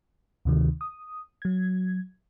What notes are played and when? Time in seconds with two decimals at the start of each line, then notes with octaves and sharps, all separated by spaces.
0.45 D2 C3 D#3
0.81 D#6
1.42 F#3 G#6